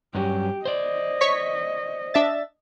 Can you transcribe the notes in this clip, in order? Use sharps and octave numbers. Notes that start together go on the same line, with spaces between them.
G2 F#3 C#4 G4
C5 D5 D#5
C#5 C#6 B6
D4 E5 A6